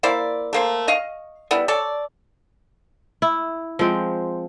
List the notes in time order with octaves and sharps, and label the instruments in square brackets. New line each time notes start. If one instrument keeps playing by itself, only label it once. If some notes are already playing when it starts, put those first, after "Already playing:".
[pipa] A#3 E4 C5 D5
A3 A#3 C5
D#5 F5 C#6
G3 B3 E4
A4 C#5 D5
[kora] E4
F3 G#3 C4